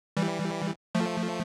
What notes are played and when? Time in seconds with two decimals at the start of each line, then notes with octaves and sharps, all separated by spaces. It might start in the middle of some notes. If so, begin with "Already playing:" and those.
0.17 E3 G3
0.95 F3 A3